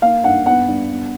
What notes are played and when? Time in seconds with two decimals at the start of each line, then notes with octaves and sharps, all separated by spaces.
0.02 A#3 F5
0.24 G2 F#5
0.46 B3 F#5
0.68 G2
0.89 B3